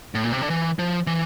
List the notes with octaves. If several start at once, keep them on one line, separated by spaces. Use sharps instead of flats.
A2
A#2
C3
D3
E3
F3
E3